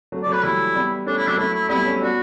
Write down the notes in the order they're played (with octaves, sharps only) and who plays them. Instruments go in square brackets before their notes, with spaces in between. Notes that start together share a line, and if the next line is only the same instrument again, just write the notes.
[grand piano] F#3 A3
[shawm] D5
[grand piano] F#3 A3
[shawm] B4
[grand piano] E3 G3 [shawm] E4
[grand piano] G3 B3
[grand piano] A3 C#4 [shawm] D4
[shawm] E4
[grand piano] F#3 A3 [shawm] D4
[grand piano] F#3 A3 [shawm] E4
[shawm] E4
[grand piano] G3 B3 [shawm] E4
[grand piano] A3 C#4
[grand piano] B3 D4 [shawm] F#4